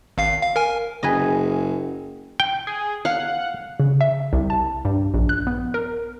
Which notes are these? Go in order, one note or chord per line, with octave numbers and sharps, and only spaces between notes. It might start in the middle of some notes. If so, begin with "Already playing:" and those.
G#1 F5 C7
F5
A#4 G#5
F#1 G#4 B4 D#5
G5
G#4
F5 F#5
C#3
E5
C2
A5
G2
A#1
F#6
B3
A#4